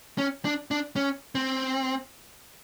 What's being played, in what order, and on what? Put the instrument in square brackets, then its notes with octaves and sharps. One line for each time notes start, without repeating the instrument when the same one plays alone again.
[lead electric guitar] C#4
D4
D4
C#4
C4